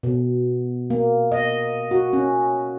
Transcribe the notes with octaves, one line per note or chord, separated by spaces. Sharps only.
B2
A#3
D#5
F#4
C#4